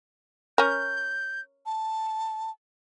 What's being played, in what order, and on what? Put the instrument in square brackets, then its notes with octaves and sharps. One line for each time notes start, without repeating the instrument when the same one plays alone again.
[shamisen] C#4 A#4 [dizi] G6
[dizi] A5